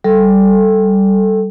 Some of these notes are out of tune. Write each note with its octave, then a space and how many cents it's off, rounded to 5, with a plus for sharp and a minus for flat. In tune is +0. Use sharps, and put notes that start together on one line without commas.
G3 -15 A4 +0